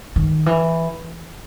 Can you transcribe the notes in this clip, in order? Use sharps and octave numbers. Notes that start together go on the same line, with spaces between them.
D#3
E3